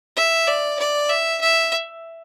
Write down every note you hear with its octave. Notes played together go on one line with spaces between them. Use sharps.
E5
D5
D5
E5
E5